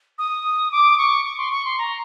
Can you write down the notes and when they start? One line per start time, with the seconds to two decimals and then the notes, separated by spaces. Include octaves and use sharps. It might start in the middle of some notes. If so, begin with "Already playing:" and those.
0.18 D#6
0.72 D6
0.98 C#6
1.25 C#6
1.38 C6
1.51 C#6
1.65 C6
1.78 A#5